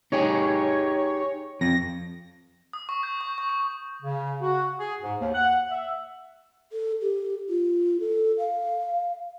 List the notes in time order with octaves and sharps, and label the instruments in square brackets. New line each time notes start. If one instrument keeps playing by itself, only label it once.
[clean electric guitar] D#4 G4 G#4 [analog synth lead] C#5
[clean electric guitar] F2 [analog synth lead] A#6
[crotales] D#6
C#6
G6
C#6
C#6
C#6
[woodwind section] C#3
F#4
G#4
G#2
D#2
F#5
E5
[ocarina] A4
G4
F4
A4
F5